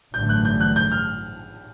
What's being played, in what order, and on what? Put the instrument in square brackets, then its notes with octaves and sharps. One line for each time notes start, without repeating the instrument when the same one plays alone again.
[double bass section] A1 G2 D3 F#3 A3 [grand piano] G6
[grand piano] F#6
G6
F#6
G6
F6